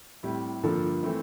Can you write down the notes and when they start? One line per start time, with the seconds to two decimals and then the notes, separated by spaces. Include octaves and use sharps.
0.23 A2 G3 C4 E4 G4
0.63 G2 D3 F3 A#3 D4 A4
1.03 E3 A3 C4 E4